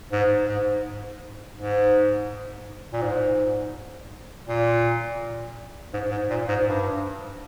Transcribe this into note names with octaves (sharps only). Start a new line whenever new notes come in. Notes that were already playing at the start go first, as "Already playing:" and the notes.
G#2
G#2
G#2
A#2
G#2
A#2
G#2
G#2
A#2
G#2
G2